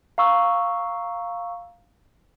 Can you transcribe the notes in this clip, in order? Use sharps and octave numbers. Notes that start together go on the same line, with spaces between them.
F5 A#5 C#6 E6